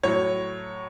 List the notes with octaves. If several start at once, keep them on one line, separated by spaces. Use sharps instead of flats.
A2 F#3 C#5